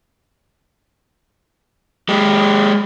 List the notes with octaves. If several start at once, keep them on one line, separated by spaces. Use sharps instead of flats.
G#3 G4